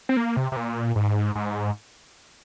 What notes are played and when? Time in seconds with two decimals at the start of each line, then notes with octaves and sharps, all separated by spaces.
0.09 C4
0.17 A#3
0.37 C3
0.52 C3
0.56 A#2
0.96 G#2
1.35 G#2